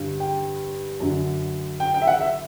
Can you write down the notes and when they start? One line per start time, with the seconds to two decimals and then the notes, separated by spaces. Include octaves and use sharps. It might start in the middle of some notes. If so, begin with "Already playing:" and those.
Already playing: G2 D3
0.20 G5
1.00 F#2 D3
1.80 G5
1.94 G5
2.02 E5
2.07 F#5
2.21 E5